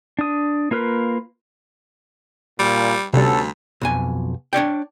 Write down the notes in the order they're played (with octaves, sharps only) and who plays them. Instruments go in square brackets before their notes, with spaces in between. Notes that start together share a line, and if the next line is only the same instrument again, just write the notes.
[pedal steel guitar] D4 D#6
A#3 F4 A#4 B4
[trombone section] A#2 [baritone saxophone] G3
[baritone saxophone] D2 [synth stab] C3 G3 [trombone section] B3 C#4 A4
[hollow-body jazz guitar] B1 F2 G#5
D4 C#5 D5 G5